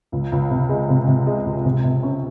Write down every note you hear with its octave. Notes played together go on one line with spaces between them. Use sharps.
C#2
C#2
C3
G#3
C3
C3
G#3
C#2
C3
C3
C#4